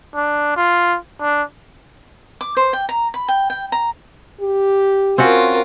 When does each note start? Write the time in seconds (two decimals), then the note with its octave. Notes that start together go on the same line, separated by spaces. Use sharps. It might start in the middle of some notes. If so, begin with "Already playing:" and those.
0.15 D4
0.56 F4
1.21 D4
2.41 D6
2.57 C5
2.73 G5
2.89 A#5
3.14 B5
3.28 G5
3.50 G5
3.72 A#5
4.41 G4
5.18 C4 C#4 F4 F#4 A#4